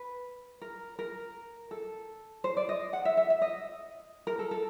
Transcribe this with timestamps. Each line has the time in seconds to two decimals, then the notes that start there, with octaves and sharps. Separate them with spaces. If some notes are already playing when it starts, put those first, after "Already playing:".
Already playing: B4
0.61 A#4
0.99 A#4
1.71 A4
2.44 C5
2.57 D5
2.69 D#5
2.93 F#5
3.05 E5
3.17 E5
3.30 E5
3.42 D#5
4.27 A#4
4.39 A4
4.51 A4